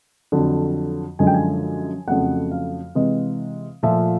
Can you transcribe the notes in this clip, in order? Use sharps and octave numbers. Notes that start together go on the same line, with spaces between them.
F2 D3 F#3
F#2 D3 F3 G#3 G#5
G5
G#5
F2 C#3 F#3 A3 F#5
F5
C3 E3 G#3
A#2 F3 A3 E5